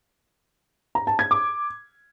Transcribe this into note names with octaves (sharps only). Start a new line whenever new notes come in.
A#5
A5
G#6
D6